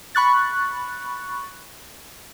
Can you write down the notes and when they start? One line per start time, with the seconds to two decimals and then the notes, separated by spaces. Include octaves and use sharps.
0.15 B5 C#6 F#6 A6